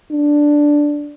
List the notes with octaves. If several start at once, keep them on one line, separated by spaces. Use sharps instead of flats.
D4